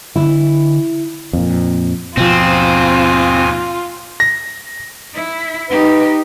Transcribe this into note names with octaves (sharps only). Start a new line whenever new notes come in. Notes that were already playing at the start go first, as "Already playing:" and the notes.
D3 E4
F2 A#2
D#2 G#2 B2 F3 C4 F4 G#5
A#6
E4
D#4 G4 B4